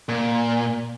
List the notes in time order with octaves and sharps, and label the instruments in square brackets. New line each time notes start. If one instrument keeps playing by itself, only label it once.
[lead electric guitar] A#2